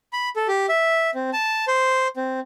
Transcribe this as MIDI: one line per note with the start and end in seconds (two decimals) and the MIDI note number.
0.13 0.29 83
0.36 0.47 69
0.48 0.66 67
0.69 1.10 76
1.15 1.30 60
1.33 1.65 81
1.68 2.08 72
2.17 2.40 60